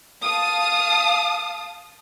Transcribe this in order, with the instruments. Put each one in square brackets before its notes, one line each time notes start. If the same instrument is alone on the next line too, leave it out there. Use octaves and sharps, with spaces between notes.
[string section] F5 A5 D#6